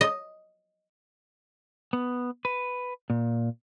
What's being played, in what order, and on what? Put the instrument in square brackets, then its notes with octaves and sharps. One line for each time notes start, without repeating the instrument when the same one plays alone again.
[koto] D#5
[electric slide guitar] B3
B4
A#2